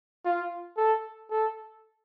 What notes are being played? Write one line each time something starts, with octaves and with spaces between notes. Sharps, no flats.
F4
A4
A4